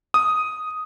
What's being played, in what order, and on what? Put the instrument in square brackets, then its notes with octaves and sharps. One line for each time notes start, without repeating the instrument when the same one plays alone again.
[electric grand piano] D#6